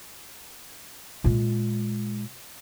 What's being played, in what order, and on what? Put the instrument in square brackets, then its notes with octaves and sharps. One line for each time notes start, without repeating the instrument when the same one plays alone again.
[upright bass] A#2 G#3